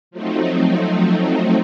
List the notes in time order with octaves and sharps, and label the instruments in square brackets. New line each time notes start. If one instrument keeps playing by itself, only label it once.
[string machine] F3 F#3 A3 C4 D#4